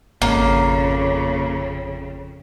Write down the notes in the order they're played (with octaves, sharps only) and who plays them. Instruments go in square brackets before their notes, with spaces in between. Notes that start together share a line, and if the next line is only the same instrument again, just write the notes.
[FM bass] G#1 [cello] F2 C#3 [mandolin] A#3 [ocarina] C#5